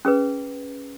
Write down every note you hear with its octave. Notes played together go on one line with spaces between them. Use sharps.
C#4 G#4 B4